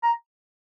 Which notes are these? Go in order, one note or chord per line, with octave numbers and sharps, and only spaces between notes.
A#5